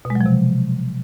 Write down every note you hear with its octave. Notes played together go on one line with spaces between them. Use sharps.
B2
G#3
F#3
F3
C3